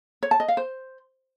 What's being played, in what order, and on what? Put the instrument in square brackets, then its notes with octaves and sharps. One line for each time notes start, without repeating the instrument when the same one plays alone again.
[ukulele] C#5
A5
D#5
F5
C5